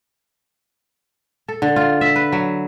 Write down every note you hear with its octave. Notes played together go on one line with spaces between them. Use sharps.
A4
D3
F4
E5
B4
F#3